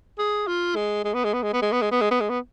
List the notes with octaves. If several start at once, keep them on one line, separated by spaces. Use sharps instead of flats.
G#4
F4
G#3
G#3
B3
G#3
B3
G#3
B3
G#3
B3
G#3
B3
G#3
B3
G#3
B3